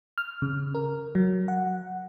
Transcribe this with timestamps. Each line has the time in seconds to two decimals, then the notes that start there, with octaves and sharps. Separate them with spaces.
0.18 F6
0.42 C#3
0.75 A#4
1.15 F#3
1.48 F#5